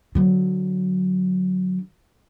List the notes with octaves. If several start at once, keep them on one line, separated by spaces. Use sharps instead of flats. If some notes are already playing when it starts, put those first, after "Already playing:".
D3 F#3